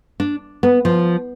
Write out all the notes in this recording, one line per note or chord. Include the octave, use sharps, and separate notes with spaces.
D4
B3
F3